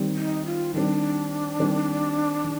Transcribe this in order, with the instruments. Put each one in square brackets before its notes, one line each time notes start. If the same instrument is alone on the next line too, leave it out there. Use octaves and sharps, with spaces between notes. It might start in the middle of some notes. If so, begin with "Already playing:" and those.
Already playing: [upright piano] D#3 G3 C4
[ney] D#4
F4
[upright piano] D#3 G3 C4 [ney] D4
[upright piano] D#3 G3 C4
D#3